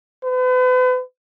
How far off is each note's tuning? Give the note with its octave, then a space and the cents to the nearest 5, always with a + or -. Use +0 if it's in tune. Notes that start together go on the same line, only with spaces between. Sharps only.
B4 +40